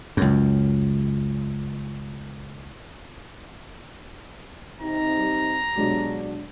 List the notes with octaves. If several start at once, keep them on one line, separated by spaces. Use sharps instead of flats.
C#2 F#2
C3 D#4 A#5
G3
B2 F#3 G#3 D4 G4